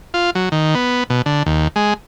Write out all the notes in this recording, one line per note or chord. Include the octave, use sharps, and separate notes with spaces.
F4
F#3
D#3
B3
B2
D3
D#2
G#3